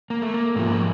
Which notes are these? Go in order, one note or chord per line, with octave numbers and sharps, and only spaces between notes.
A#3
A3
A#3
G#2 F3 G#3 A3
A#3